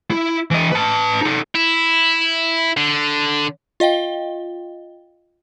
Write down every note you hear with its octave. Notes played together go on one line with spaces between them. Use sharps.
E4
E3 D#5
B4 A5
D#4 A4
E4
D3
F4 D#5 F5 G5 G7